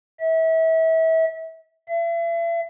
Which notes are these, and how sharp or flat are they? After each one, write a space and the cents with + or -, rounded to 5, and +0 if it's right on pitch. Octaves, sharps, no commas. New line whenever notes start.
E5 -30
E5 +40